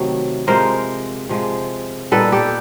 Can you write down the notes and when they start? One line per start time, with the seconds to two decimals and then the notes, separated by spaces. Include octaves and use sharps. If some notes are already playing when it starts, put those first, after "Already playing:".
Already playing: C3 D#3 F#3 A3
0.47 C3 F3 G#3 A#4 C5
1.29 C3 F3 G#3
2.11 A#2 G3 B3 D#4 A4 B4
2.32 G4 A4